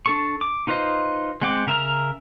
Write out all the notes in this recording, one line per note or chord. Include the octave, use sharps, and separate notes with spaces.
D4 A4 C#6
D6
D#4 F4 B4 C5 D#5
G#3 C4 F#5 G5 D6
C#3 A#4 E5 A#5 F6